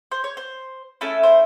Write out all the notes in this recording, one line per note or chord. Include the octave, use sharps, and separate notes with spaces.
C5
C#5
C5
A3 C#4 E4 A4
C5